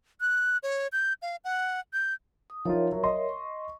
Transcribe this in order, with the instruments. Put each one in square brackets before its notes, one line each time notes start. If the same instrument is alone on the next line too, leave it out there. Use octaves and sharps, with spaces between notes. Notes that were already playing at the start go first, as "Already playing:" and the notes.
[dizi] F#6
C#5
G6
F5
F#5
G6
[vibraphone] D#6
[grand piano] F3 D#4 F4 [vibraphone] A#4 C#5 E5
[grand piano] F#3
D#5 C6
[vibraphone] C#6